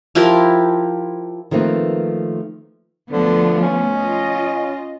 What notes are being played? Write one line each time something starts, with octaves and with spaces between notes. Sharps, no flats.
F3 E4 G4 A#4
D#3 F3 A3 A#3 C4 B4
D2 D3 F3 B3
C#4
F4 D#5